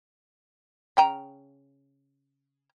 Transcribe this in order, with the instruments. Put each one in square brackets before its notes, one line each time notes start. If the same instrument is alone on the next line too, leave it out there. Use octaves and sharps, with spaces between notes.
[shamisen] C#3 G5 A#5